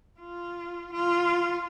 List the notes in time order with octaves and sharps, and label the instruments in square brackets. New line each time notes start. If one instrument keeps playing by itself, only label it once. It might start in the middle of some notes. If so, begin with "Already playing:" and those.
[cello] F4
F4